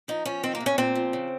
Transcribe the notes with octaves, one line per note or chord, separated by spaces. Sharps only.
F3 D#4
F3 C#4
D#3 C4
A#3
C3
C#4
A#2 C4
F3
C#3